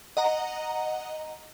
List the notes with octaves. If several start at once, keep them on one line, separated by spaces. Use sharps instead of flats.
D#5 F#5 A#5